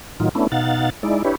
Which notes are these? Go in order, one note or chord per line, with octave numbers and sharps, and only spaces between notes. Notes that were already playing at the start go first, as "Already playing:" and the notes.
A2 D#3 F#3 D#4 F4
A3 B3 C#4 D4 E4
B2 D#4 F5 F#5 A6
G#3 D#4 E4 D5
D4 E4 G4 B4 C#5